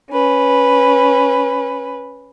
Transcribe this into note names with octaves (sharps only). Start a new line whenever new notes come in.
C#4 B4